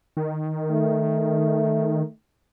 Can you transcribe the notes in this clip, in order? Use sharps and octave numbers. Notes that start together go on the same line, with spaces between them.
D#3
A3